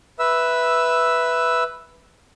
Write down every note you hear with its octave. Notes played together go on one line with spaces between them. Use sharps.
B4 E5 E6